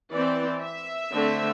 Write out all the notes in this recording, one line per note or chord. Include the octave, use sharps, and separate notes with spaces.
E3 C4 D5
E5
D3 A3 C4